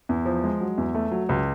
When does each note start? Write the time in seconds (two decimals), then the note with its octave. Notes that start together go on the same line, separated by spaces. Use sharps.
0.09 E2
0.25 F3
0.44 G#3
0.61 F#3
0.78 E2
0.95 A3
1.11 F#3
1.29 C#2